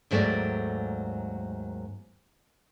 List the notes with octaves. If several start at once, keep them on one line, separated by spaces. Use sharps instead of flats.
D#2 G#2 F#3 A3 A#3 D5